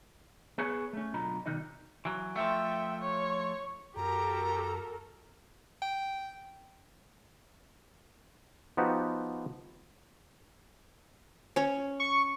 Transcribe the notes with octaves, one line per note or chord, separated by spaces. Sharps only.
B3 G#4 B4 C#5
A3 C#4
B1 D3 F4 D#5 A#5 B5
B2 D#3 G3 D#4 D#5
E3 F#3
F3 A3 E5 G5
C#5
F#2 F#4 G4 A4 A#4 A#5
G5
F3 B3 D#4 F#4 G4 B4
C#4 C#5
C#6